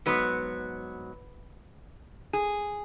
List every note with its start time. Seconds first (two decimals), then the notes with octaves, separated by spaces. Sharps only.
0.06 G#2 F#3 B3 B4
2.33 G#4